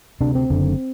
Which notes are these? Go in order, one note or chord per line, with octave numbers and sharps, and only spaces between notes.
D2 C3 D4
C4
F#1 F#2 D3